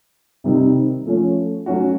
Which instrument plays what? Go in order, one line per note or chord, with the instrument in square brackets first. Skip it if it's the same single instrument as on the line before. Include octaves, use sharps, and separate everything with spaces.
[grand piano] C3 D#3 G3 C4 D#4
F3 A3 C#4
F#3 A3 C#4 F#4